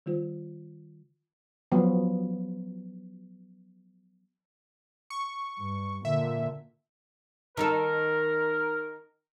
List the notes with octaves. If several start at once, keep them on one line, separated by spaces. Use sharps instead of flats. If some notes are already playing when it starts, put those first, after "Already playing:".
D#3 G3 F4 C5
F3 F#3 B3
C#6
G2
A#2 D3 E5
D#3 D#4 A4 A#4